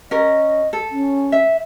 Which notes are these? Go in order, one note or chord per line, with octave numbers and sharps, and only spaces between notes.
C#4 A#4 D#5
A4
C#4
E5